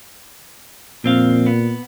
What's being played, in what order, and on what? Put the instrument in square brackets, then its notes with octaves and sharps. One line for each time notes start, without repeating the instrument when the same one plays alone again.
[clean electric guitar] F2 C4 F5 [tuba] A#2
[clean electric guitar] B3